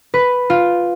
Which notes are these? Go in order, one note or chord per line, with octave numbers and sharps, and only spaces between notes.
B4
F4